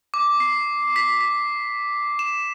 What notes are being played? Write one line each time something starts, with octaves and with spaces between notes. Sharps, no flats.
D6
C7
B6
B6
E7